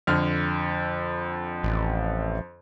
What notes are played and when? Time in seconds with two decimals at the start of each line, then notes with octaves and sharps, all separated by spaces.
0.07 F2 D3 F6
1.63 A1